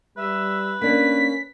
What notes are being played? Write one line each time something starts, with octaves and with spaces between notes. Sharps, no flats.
G3 B4 E5
A#3 C#4 D4 B6